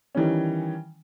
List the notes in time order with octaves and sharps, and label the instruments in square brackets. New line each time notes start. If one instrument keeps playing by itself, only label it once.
[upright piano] D#3 E3 G3 C#4